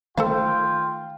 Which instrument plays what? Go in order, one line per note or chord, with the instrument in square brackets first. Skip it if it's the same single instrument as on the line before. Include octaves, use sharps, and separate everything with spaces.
[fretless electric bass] D#3 A3 [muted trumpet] F4 [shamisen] A4 C5 F5 [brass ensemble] G5